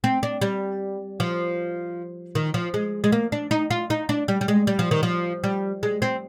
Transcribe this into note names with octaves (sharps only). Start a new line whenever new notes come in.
C4
D4
G3
F3
D#3
F3
G#3
G#3
A#3
D4
D#4
F4
D#4
D4
G3
G3
G#3
G3
F3
D#3
F3
G3
G#3
C4